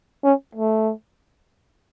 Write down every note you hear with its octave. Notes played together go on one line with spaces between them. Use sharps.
C#4
A3